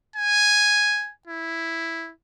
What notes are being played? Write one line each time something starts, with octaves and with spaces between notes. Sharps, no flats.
G#5
E4